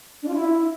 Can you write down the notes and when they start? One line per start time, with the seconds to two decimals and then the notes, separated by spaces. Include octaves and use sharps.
0.22 D4
0.28 F4
0.34 E4